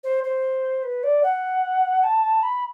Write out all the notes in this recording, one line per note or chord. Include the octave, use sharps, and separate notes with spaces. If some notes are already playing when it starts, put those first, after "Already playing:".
C5
C5
B4
D5
F#5
A5
B5